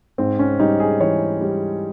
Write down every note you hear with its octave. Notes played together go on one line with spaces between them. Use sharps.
G#2 C4
C#4
G3 D#4
G#4
E3 C#5
G3